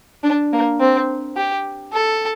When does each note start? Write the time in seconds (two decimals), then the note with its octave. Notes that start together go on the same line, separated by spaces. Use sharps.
0.23 D4
0.52 A#3
0.80 C4
1.37 G4
1.93 A4